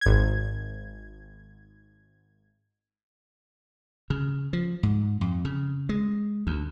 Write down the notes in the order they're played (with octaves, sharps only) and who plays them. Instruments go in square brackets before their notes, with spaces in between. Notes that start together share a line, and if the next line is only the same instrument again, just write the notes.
[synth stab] G#1 G#6
[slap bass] C#3
F3
G#2
F2
C#3
G#3
D2